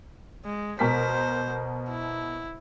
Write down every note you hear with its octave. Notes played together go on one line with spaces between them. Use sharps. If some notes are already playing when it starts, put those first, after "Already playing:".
G#3
B2 A#4 C5 B6
E4